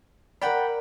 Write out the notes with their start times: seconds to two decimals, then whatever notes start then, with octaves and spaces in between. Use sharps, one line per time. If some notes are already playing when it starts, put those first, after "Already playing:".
0.41 A#4 D5 F#5 G5 B5